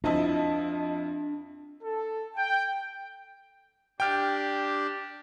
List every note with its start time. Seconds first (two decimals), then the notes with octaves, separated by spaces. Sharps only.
0.04 F2 F3 D4 E4 D#5 A5
1.82 A4
2.36 G5
4.00 D4 G4 G5 F6